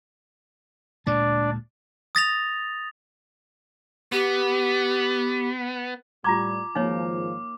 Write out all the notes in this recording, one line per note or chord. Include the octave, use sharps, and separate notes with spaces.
D2 A#2 G#3 D4 D5
D#6 A6 A#6 F7
B3 G4
A2 G3 F4 A#5 C#6 D6 G#6
G#1 F3 A#3 D#4 C#5